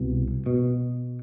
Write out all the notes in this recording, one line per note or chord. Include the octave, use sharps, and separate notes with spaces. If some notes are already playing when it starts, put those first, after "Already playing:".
Already playing: C2 B2
B2